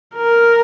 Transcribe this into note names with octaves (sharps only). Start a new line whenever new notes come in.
A#4